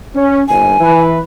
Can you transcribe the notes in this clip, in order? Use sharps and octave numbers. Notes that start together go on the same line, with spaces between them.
C#4
G1 D#2 G#5
E3 B4